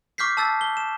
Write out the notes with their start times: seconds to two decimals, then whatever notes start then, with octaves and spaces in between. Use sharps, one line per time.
0.18 C#6 D6 F6 G6 B6 C7
0.37 A5 E6 A6
0.61 G7
0.77 E7